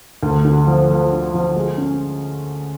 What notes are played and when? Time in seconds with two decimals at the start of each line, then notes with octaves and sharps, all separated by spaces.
0.23 D2
0.45 D3
0.67 F3
0.90 F3
1.12 D3
1.34 F3
1.56 G#3
1.78 C#4